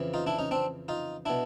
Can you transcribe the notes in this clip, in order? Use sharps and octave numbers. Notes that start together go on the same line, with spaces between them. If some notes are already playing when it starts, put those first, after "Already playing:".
Already playing: F2 C#3 E3
D#4 F4
D4 E4
C#4 D#4
C4 D4
D#4 F4
B2 D4 E4